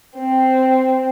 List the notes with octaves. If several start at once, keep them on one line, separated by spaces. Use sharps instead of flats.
C4